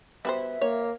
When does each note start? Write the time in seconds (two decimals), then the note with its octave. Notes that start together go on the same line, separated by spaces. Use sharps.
0.25 G3 B3 F#4 C5 E5
0.61 A#3 C#5